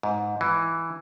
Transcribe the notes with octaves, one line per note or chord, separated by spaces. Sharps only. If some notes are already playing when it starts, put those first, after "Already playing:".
G#2
E3